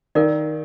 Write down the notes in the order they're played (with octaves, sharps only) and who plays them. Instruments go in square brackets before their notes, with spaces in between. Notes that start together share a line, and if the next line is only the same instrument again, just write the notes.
[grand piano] D#3 [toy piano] A#4 D5 F5